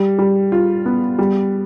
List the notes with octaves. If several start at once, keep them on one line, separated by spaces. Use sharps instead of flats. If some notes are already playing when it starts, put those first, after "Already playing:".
Already playing: G3
G3
F4
B3
G3